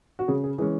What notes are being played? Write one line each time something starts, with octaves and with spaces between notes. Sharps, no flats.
F#4
C#3 G#4
G#4
E3 G#3 C#4 G#4